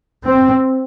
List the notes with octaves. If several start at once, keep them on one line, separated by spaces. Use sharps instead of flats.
C4